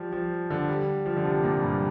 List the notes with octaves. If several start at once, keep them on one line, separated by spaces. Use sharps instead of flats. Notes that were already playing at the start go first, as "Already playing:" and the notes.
Already playing: F3 G3
F3
D3
G3
F3
D3
C3
A#2
G2